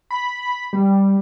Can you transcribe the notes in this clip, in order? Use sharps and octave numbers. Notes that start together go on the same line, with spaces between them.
B5
G3